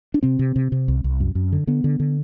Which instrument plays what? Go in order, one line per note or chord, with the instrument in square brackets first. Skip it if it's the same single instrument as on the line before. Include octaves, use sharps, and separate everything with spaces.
[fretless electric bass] D4
C3 C4
C3
C3
C3
C2
C2
F#2
F#2
D3
D3 B3
D3
D3